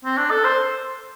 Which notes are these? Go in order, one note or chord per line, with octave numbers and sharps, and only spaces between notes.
C4
D4
A4
C5